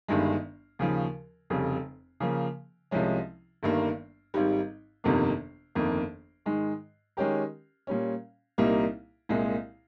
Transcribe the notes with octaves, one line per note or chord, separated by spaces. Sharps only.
G1 G2 D#3 G#3
D#2 C#3 F3
F1 F2 C#3 G3
C#3 F3 A#3
C2 C3 F3 G#3 C#4
G1 G2 D#3 A#3
G#1 G#2 G3
G1 F2 C3 D#3 A#3
G1 F2 D#3 A#3
G#2 D#3 G#3
D#3 G#3 C#4 G4 A#4
A#2 G3 C#4
C2 A#2 G3 A#3 D#4
C2 A#2 G#3